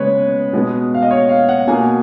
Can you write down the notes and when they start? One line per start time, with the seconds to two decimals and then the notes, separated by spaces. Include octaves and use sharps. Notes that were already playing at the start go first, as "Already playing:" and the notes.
Already playing: C#3 G#3 B3 B4 C#5
0.53 B2 G#3 B3
0.94 F5
1.03 D#5
1.11 C#5
1.29 F5
1.49 F#5
1.67 B2 A#3 G#5